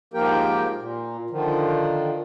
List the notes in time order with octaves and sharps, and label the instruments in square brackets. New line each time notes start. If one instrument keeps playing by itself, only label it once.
[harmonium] G#2 F3 A#3 G4 A#4 G5
A#2
D3 D#3 F3